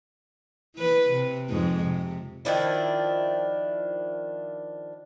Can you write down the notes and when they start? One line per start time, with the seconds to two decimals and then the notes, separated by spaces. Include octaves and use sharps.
0.76 E3 B4
1.10 C3
1.50 F2 G#2 G#3
1.83 C3
2.45 D#3 F3 D4 E4